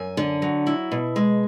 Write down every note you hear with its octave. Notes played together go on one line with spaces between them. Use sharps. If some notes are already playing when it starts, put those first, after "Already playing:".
Already playing: F#2 G#5
D3
F#3
E4
B2
G#3